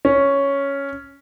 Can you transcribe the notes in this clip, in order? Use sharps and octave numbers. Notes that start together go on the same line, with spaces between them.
C#4